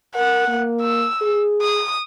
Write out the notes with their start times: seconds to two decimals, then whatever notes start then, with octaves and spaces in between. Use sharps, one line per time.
0.16 A#4 F#5
0.48 A#3
0.81 E6
1.22 G#4
1.61 D#6